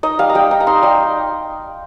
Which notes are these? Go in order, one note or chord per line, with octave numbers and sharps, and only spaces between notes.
D#4 D#5
G3 F5
A#5
G3 G5
D#4
A#5
D#4 C6
G3